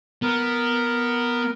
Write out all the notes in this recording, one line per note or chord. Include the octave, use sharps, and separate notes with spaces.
B3 A#4